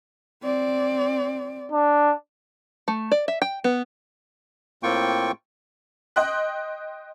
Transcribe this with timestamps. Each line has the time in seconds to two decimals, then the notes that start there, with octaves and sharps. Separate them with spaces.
0.43 C4 D5
1.72 D4
2.88 A3
3.12 D5
3.28 E5
3.42 G5
3.64 B3
4.83 A2 A#3 C4 F4 G5 C#6
6.16 D#5 G5 C6 F#6